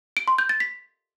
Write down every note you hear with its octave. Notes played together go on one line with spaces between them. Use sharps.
D7
C6
G6
A6
B6